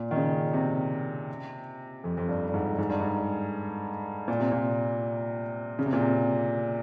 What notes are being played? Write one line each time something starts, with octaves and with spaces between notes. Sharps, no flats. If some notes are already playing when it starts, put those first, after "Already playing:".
Already playing: A#2
D#3
C#3
C3
F2
F2
G2
G2
G#2
G#2
G2
G#2
A#2
C3
A#2
C#3
C3
A#2
C3